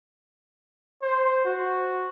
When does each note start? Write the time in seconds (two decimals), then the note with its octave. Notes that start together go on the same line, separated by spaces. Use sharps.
1.02 C5
1.45 F#4